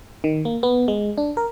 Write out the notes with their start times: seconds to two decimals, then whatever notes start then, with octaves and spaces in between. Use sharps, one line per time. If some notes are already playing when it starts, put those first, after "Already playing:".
0.24 D#3
0.45 A#3
0.63 B3
0.88 G#3
1.18 D4
1.37 A#4